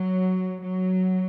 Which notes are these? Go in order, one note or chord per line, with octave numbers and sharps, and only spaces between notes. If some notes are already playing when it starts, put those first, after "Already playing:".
Already playing: F#3
F#3